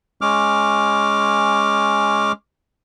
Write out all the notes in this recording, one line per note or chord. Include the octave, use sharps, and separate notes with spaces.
G#3 C#4 D6 F6